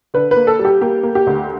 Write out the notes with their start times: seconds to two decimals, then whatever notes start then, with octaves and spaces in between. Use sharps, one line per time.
0.14 D3 B4
0.31 B4
0.36 A#3
0.47 A4
0.59 G3
0.65 G4
0.81 A#3 G4
1.03 A#3
1.15 G4
1.27 D2